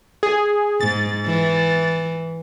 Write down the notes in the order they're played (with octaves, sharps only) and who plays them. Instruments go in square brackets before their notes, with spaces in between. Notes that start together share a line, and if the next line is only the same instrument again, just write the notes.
[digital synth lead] G#4
[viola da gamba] G#2 [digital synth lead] A6
[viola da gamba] E3